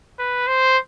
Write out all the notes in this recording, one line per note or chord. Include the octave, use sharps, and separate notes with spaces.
B4
C5